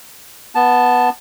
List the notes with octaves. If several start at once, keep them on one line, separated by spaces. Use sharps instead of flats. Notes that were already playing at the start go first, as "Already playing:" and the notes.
B3 A5